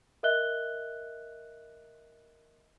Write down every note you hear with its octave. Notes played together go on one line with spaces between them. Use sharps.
A#4 D#5 E5 F#6 G7